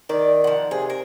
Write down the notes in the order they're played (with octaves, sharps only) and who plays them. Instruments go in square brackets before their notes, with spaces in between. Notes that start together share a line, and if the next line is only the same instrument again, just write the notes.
[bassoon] D#3 [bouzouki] D5
[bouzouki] F3 F#5
[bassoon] C3 [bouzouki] G#4
[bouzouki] A#4